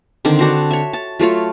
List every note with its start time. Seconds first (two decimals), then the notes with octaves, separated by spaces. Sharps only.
0.25 D3 D#3 C4 D4
0.39 D4 F#4 C5
0.71 C#5 E5
0.93 A5
1.20 F#3 A3 F4 C#5